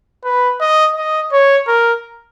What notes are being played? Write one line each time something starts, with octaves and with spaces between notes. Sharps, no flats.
B4
D#5
D#5
C#5
A#4